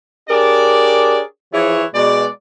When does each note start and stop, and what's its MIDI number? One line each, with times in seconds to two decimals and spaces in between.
0.30 1.20 62
0.30 1.20 67
0.30 1.20 68
0.30 1.20 70
0.30 1.20 73
0.30 1.20 74
1.53 1.83 52
1.53 1.83 53
1.53 1.83 64
1.53 1.83 68
1.53 1.83 73
1.94 2.26 47
1.94 2.26 56
1.94 2.26 74